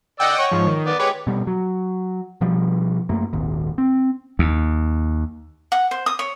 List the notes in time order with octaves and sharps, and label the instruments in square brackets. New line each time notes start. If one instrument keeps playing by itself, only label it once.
[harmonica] D5 E6 [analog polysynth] D#5 F#5 G5
[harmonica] C#5
[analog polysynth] G#2 F3
D#3
[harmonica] B3 D5
[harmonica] G#3 G4 D6 [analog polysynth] B4 C#5
[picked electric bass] B2 G3
F#3
B2 F3 G3
F#2 A3 A#3
D#1 G#1 D#3
C4
[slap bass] D#2
[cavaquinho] F#5
C5
D#6
C#5